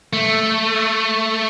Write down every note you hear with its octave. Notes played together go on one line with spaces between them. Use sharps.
A3